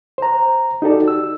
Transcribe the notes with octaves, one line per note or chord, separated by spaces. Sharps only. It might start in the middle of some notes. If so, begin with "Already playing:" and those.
C5 A#5
D#4 F#4 G4 A4 D5
E6